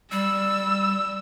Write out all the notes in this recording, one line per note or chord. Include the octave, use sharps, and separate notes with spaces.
G3 E6